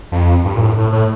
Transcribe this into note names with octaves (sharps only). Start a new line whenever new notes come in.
F2
G2
A#2
A2
A2
A2